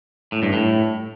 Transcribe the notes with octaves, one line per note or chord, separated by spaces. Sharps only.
A2
G2
A2